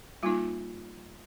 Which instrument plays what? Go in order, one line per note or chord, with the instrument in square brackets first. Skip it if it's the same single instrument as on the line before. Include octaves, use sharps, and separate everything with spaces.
[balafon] G3 A#3 D#4 F4